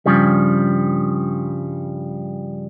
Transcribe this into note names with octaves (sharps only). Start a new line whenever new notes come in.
G2 C#3 F3 G3